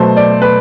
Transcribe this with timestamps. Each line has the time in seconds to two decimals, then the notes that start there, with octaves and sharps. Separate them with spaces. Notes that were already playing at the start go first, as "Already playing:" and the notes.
Already playing: B2 F#3 A3 C5
0.17 D5
0.42 B4